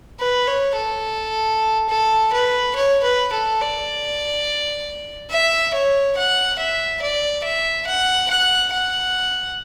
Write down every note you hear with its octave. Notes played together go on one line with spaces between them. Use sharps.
B4
C#5
A4
A4
B4
C#5
B4
A4
D5
E5
C#5
F#5
E5
D5
E5
F#5
F#5
F#5